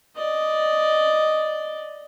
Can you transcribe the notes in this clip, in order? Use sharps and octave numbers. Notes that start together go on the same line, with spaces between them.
D5 D#5